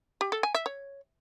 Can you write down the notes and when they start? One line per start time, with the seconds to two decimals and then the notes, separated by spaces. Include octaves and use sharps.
0.21 G4
0.32 A4
0.43 G#5
0.54 E5
0.66 C#5